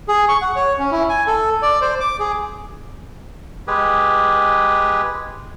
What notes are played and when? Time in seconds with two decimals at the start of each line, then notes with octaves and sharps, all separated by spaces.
0.08 G#4
0.28 C#6
0.42 F#5
0.56 C#5
0.79 C#4
0.91 E4
1.09 G#5
1.27 A4
1.62 D5
1.81 C5
2.00 D6
2.19 G#4
3.68 G#3 G4 G#4 B4